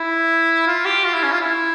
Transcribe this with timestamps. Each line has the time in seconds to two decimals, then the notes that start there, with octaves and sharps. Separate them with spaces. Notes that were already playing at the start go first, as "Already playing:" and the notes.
Already playing: E4
0.67 F4
0.85 G4
1.04 F4
1.14 E4
1.23 C#4
1.32 F4
1.41 E4